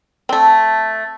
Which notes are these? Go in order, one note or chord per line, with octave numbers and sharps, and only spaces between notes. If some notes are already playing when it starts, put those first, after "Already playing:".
A3 C4